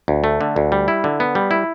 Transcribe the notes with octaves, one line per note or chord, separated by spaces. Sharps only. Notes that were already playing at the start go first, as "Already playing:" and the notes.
D2
A3
D3
D2
G3
E4
D3
B3
G3
E4